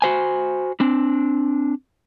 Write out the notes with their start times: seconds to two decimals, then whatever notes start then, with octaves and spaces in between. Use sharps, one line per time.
0.02 F#4 C5 G#5
0.80 C4 D4